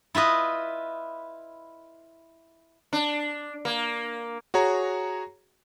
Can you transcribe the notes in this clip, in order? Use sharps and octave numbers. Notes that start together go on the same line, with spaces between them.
E4 F4 B4 D#5
D4
A#3
F#4 G#4 C#5 A#5